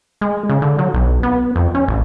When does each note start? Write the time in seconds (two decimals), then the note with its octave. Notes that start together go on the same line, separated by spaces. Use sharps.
0.21 G#3
0.49 C#3
0.62 D3
0.79 F#3
0.94 B1
1.23 B3
1.56 F2
1.75 C#4
1.88 A1